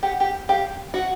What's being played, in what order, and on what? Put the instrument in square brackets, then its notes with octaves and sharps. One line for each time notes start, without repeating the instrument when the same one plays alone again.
[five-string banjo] G4 [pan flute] F#5
[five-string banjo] G4
[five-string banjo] G4 [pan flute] F5
[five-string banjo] F#4 [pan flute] F#5